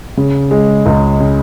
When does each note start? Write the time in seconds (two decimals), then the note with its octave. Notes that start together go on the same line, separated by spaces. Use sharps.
0.17 C#3
0.51 G#3
0.86 C#2
1.20 C#3